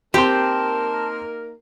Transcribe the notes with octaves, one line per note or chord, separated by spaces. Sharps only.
A#3 C4 D#4 G4 A#4 A5 C6